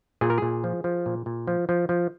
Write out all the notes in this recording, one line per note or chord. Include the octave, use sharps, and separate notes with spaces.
A#2 G#4
A#4
A#2 G#4
F3
F3
A#2
A#2
F3
F3
F3